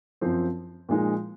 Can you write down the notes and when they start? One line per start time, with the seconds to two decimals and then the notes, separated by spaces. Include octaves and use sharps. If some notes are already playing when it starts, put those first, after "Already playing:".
0.21 F#2 F3 C4
0.89 A#2 F3 G#3 D#4